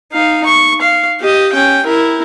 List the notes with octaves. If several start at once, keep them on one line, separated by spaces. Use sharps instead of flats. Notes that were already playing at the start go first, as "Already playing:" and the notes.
D#4 F5
C#6
F5
G4 D#5
C#4 G5
E4 A#4